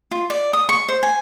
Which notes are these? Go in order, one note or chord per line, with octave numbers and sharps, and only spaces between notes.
F4
D5
D#6
C#6
C5
G#5